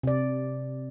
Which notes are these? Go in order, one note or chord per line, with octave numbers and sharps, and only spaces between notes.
C3 D5